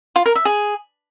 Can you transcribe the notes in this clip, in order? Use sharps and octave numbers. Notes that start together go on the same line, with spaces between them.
F4
A#4
E5
G#4